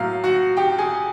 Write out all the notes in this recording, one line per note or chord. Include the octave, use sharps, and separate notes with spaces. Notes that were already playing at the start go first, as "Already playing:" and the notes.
Already playing: A2 F#3 A#3 F5
F#4 F#5
G4 G5
G#4 G#5